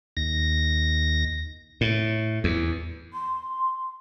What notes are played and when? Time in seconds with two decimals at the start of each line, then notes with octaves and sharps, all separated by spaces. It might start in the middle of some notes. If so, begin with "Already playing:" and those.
0.17 D#2 A#6
1.81 A2
2.44 E2
3.13 C6